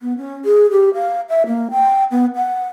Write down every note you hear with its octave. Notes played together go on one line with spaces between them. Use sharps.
B3
C#4
G#4
G4
F5
E5
A#3
G5
B3
F#5